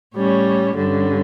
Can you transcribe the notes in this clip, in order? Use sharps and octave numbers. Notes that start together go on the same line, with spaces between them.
A2 G3 C#4 C#5
G2 D3 G3 C#4